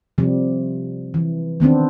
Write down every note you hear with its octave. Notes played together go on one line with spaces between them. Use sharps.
C3 F3 G3
E3
D#3 B3 C4 D4